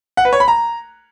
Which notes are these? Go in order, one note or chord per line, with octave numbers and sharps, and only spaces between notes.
F#5
B4
C#5
B5
A#5